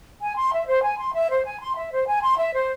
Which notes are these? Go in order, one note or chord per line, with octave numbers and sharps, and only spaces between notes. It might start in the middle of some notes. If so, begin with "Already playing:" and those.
G#5
C6
E5
C5
G#5
C6
E5
C5
G#5
C6
E5
C5
G#5
C6
E5
C5